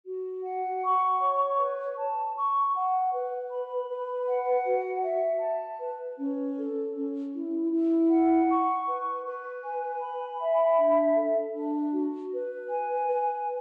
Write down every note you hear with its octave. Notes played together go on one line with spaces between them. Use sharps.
F#4
F#5
C#6
C#5
B4
A5
C#6
F#5
B4
B5
B4
F#5
F#4
E5
A5
B4
C#4
A4
C#4
E4
E4
F#5
C#6
B4
B4
G#5
B5
E5
D4
A4
D4
F#4
B4
G#5
B4